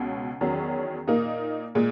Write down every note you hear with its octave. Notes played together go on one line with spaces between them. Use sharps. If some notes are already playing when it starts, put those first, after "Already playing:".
Already playing: C#2 B2 C#4
E2 D#3 F#3 C#4
A#2 A#3 D#4
A#2 G#3